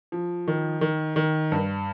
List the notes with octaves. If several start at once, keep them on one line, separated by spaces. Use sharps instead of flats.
F3
D#3
D#3
D#3
G2